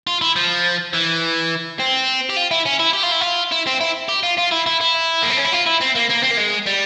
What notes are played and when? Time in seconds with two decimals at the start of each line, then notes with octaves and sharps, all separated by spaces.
0.07 F4
0.21 E4
0.36 F3
0.93 E3
1.79 C4
2.29 G4
2.36 F4
2.51 E4
2.66 C#4
2.80 E4
2.94 G4
3.03 F4
3.12 E4
3.21 F4
3.51 E4
3.66 C4
3.80 E4
4.08 G4
4.23 F4
4.38 F4
4.51 E4
4.66 E4
4.81 E4
5.23 A#3
5.30 C4
5.38 C#4
5.45 E4
5.53 F4
5.67 E4
5.82 C4
5.96 A#3
6.10 A#3
6.23 C4
6.31 A#3
6.38 G#3
6.67 G3